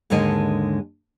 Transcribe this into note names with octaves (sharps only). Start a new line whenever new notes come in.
D#2 G#2 D3 G#3 A#4 D#5